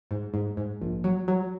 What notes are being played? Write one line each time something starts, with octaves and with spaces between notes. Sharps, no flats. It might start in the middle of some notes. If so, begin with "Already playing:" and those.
G#2
G#2
G#2
A#1
F#3
F#3